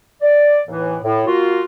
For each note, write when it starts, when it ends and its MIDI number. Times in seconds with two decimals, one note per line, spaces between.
0.22 0.61 74
0.68 0.97 39
0.68 0.97 45
0.68 0.97 52
1.04 1.22 45
1.27 1.62 58
1.27 1.62 65
1.27 1.62 66